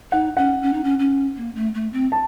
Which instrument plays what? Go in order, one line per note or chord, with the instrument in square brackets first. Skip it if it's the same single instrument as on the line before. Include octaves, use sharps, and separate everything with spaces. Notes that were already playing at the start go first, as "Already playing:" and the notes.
[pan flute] D#4 [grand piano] F#5
[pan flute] C#4 [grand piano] F#5
[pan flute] C#4
D#4
C#4
C#4
A#3
A3
A3
C4
[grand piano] A5